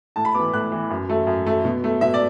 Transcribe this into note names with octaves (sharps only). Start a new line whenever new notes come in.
A2 A5
B5
E3 B3 D6
A2 F#6
E3 B3
F#2
F#3 A3
F#2
F#3 A3
B2
A3
B2 E5
D5